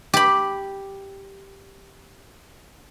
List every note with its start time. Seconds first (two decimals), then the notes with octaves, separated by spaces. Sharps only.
0.14 G4 B5